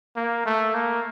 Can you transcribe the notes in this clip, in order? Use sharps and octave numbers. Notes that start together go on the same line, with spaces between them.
A#3
A3
A#3